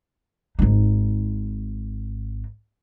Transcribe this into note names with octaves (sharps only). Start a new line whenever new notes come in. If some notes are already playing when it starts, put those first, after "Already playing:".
G#1 D#4